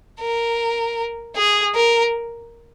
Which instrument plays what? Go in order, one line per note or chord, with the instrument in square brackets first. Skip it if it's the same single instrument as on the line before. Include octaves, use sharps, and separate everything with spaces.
[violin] A#4
G#4
A#4